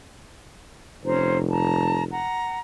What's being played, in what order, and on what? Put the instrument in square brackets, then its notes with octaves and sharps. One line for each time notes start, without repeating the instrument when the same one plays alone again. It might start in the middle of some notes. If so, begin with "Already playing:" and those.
[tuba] F1 [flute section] C#4 C5 A#5
[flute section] A5 A#5
F#5 A#5